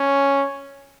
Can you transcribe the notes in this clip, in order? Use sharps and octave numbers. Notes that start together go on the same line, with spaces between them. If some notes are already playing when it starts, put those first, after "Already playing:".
Already playing: C#4